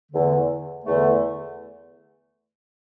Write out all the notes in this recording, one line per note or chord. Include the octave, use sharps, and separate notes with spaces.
E2 D3 A3
E2 D3 A3